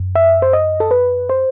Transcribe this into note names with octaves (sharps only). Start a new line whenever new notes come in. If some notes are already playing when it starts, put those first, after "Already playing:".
Already playing: F#2
E5
C5
D#5
A4
B4
C5